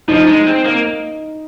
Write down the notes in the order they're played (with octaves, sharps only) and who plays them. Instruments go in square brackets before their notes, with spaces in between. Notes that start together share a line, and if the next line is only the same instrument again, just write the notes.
[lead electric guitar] F3 [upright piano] D#4
[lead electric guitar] G#3
C4
A#3